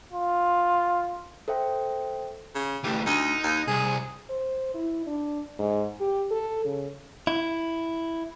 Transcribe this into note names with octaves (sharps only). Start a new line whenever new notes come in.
F4
A4 C5 E5 G5
C#3
D2 E3 G3
D2 D#4
D#2
C2 G#4
C5
E4
D4
G#2
G4
A4
C#3
E4